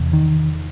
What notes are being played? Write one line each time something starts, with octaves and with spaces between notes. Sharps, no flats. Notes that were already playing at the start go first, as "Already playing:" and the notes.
Already playing: E2 C3
D#3